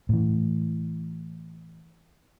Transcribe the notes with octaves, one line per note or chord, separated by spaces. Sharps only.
A2 E3